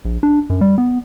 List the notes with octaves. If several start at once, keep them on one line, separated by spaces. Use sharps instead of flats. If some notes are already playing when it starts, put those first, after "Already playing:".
A#1
D4
F#2
G3
B3